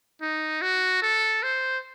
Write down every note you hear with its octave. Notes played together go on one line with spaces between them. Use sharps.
D#4
F#4
A4
C5